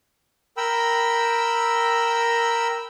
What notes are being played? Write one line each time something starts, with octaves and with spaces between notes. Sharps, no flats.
A#4 G5 B5 E6